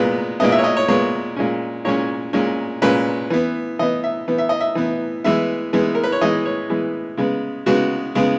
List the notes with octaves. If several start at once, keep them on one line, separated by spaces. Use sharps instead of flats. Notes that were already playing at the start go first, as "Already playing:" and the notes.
Already playing: A#2 G#3 B3 B4
A#2 G#3 B3 D#5
E5
C#5
D#5
C#5
A#2 G#3 B3 C#5
A#2 G#3 C#4
A#2 G#3 C#4 C#5
A#2 G#3 C#4
A#2 G#3 C#4 B4
E3 B3
E3 B3 D#5
E5
E3 B3
E5
D#5
E5
E3 B3
E3 G#3 B3 E5
E3 G#3 B3
A#4
B4
C#5
E3 G#3 B3 D#5
C#5
E3 G#3 B3
C#3 G#3 B3
C#3 G#3 B3 F#4
C#3 G#3 B3